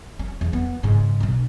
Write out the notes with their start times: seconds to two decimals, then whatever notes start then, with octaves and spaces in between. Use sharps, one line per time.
0.19 C#4
0.41 E2
0.53 B3
0.83 G#2 C#3
1.20 B1 D4